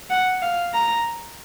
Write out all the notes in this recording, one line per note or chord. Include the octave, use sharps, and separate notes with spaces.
F#5
F5
A#5